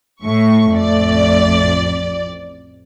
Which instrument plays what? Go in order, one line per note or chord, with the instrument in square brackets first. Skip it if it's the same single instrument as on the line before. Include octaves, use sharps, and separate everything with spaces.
[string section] A2 C#6 [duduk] A3
[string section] A1 F2 D5